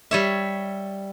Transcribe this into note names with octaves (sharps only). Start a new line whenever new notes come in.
G3 C#5 E5